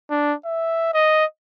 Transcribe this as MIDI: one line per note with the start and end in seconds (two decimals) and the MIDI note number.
0.10 0.34 62
0.45 0.94 76
0.94 1.25 75